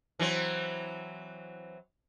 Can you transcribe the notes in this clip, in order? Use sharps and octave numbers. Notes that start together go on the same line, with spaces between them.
E3 F#3 C4